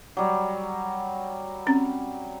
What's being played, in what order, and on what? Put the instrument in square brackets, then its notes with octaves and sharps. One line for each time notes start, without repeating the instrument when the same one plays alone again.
[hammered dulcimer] F#3 G3
[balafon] C4 C#4